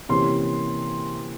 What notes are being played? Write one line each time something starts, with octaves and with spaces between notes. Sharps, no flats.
C3 E3 A#3 C#4 C6